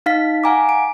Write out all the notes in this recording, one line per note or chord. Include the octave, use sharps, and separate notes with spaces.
D#4 F5 B6
F5 F#5 G#5 A#5 D6
D7